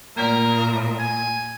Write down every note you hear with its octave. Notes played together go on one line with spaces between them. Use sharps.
A#2 A3 A#3 A#4 D5
G#5